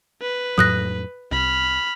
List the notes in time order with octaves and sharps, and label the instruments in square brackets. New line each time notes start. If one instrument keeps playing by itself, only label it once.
[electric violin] B4
[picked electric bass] F2 A2 F#3 [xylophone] D#6 F#6 A#6
[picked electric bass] C2 [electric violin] B5 F6